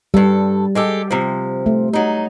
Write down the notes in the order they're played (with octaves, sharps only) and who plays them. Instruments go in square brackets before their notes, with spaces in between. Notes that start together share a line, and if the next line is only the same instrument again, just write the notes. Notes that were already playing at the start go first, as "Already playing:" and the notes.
[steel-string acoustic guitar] G2 A4 [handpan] G3
[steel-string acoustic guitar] G#3 G4 A4
C3 F3
[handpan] A3
[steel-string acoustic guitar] F#3 D#4